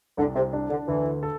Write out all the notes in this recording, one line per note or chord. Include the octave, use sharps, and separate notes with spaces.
C2 D3
C3
D4
D3
D2 E3
A4